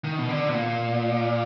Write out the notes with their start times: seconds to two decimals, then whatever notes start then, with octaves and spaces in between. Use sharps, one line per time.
0.05 D#3
0.18 B2
0.29 D3
0.49 B2
0.54 A#2